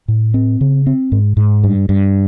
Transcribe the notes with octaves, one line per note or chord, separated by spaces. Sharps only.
A2
C4
C#3
C4
G#2
G#2
G2
G2